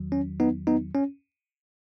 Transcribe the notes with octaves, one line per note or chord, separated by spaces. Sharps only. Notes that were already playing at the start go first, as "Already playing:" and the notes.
Already playing: E2 D#3 F#3
C#4
B3 D#4
B3 D#4
C#4